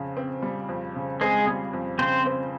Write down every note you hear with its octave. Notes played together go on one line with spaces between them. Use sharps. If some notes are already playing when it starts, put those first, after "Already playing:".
Already playing: F2 C#3
C4
G3
F2
C#3
G#3 C4 G#4
G3
F2
C#3 C4 C5
C4